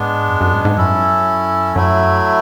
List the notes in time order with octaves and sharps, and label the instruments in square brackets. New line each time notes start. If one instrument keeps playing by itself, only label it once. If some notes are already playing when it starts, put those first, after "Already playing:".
Already playing: [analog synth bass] G#2 [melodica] G#3 B3 D4
[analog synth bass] F#2
F#2
G#2
G#2
[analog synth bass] F#2 [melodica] C#4 E4 A4
[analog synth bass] F#2 [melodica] F#3 A3 E4